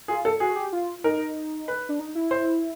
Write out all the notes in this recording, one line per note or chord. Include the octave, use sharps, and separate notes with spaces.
F4 G#4
A4
F#4 G#4
G4
F4
D#4 A#4
B4
D4
D#4
E4
C5